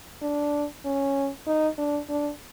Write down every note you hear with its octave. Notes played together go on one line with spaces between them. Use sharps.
D4
C#4
D#4
D4
D4